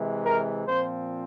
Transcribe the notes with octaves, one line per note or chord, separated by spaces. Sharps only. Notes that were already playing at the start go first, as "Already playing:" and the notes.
Already playing: C3 E3 G#3
A#4
A#2 F3 C4 C5